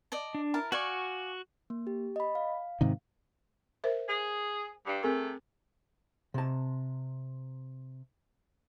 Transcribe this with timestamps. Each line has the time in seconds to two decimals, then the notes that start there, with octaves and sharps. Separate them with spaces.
0.12 D5 D#5 A5
0.35 D4
0.54 E4 A#4 A5
0.72 F#4 D5 F5 G#5 C#6
1.70 A#3
1.87 G4
2.16 D#5 B5
2.35 F5
2.81 G#2 C3 D#3
3.84 A#4 C5 E5
4.08 G#4
4.85 G2
5.03 C3 A3 C4 G#4 A#4
6.34 C3 A5